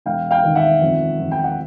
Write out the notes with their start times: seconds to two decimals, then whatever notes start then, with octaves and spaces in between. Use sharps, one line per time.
0.06 E1 F5 G5
0.31 F5 G5
0.44 D#3
0.55 E5 F#5
0.82 F2
1.19 F2
1.31 G5
1.44 F#5